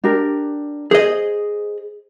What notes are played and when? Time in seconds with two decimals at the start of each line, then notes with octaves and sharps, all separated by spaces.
0.04 D4 G4 A#4
0.91 G#4 C5 D#5